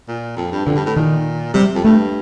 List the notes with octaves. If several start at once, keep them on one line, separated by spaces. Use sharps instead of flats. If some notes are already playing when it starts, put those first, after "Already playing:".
A#2
F2
G2
F2 D3
G2
A2
A#2 D#3
C3 G3
F2
G2 A3